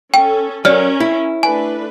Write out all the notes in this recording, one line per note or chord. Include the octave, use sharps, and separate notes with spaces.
C#4 A4 G5
F#3 C#4 A#4 D5 F6
E4
A3 D4 B4 G#5